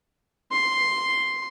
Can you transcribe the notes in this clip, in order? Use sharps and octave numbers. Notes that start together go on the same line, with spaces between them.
C6